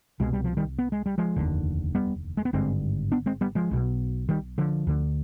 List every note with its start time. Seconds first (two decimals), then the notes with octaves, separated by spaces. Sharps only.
0.20 C2 B2 G#3
0.33 G3
0.44 F3
0.57 D#3 G3
0.79 B3
0.92 G#3
1.06 G3
1.18 F3 G#3
1.36 F1 D#2 D3
1.95 G3 B3
2.37 G#3
2.45 B3
2.53 G#1 G2 D3 G#3 C4
3.12 B3 D4
3.26 G#3 C4
3.41 G3 B3
3.55 F3 G#3
3.71 B1 B2
4.29 D#3 G3
4.58 D3 F3
4.87 D2 D3